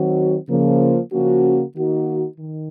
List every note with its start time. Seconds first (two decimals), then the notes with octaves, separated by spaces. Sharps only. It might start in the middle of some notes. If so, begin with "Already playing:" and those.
Already playing: D#3 F#3 C4 F#4
0.49 C#3 F3 A#3
1.12 C#3 F3 A#3 C#4 F#4
1.75 D#3 A#3 D#4 F#4
2.38 D#3